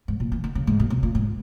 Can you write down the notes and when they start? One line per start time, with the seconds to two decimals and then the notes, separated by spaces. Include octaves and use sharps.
0.08 G#2
0.20 A#2
0.32 E3
0.44 D#3
0.55 C#3
0.67 G#2
0.80 A#2
0.90 B2
1.03 A#2
1.15 G#2